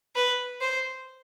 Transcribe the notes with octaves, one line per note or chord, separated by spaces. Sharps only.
B4
C5